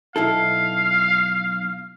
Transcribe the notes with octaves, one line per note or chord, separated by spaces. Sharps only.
B1 E4 A4 F5